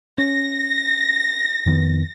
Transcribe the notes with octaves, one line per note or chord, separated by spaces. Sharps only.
C#4 A#6
F2 D#3 B3